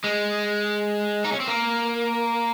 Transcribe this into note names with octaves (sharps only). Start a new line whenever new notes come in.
G#3
D#4
C#4
C4
A#3